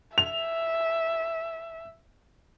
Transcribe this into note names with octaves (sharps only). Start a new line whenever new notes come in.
E5 F7